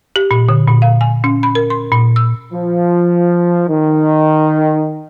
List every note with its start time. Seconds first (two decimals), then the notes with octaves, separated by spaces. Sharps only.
0.16 G4
0.31 A#2
0.49 D3
0.68 A#2
0.82 F5
1.01 G#5
1.24 C#4
1.43 B5
1.55 A#4
1.70 C6
1.92 A#2
2.16 E6
2.53 F3
3.69 D#3